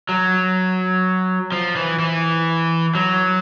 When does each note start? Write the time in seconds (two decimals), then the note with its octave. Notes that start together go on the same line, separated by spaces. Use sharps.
0.09 F#3
1.52 F3
1.76 E3
1.99 E3
2.95 F#3